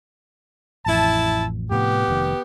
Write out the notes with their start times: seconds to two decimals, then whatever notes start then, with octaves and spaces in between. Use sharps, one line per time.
0.86 A1 F2 F3 E4 A5
1.71 A2 C3 F3 B3 G4
2.08 F1 D#3